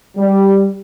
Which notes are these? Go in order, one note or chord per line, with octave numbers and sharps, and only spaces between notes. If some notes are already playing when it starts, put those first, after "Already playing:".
G3